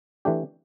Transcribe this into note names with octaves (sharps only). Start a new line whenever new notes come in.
E3 A3 D4 G4